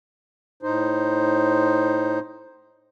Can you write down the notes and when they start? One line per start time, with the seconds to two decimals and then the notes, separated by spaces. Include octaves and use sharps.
0.63 A2 D#4 C5